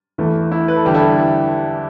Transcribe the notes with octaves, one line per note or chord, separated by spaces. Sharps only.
E2 E3 A3
E4
B4
A4
E2 D3 G3 G4
E4 A4